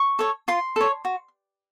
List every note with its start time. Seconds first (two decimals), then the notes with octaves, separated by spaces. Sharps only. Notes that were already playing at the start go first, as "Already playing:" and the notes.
Already playing: C#6
0.19 A4 C#5
0.48 F4 C6
0.76 A4 C#5
1.05 F#4